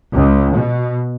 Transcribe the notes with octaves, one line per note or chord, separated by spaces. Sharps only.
C#2
B2